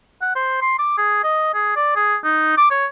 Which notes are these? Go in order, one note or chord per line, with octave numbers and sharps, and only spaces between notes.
F#5
C5
C6
D6
G#4
D#5
G#4
D5
G#4
D#4
D6
C#5